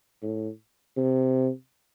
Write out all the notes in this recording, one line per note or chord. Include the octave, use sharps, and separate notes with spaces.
A2
C3